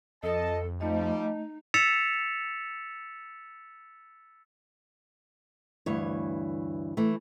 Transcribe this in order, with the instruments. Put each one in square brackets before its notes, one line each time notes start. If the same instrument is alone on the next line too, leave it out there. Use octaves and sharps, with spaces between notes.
[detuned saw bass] F2 [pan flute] A4 [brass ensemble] D#5 A5
[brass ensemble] F3 G3 [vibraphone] A3 D#5 [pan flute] D#4
[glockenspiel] E6 A6 B6 C#7 E7 F7
[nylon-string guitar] D2 G2 E3 C#5
E3 A3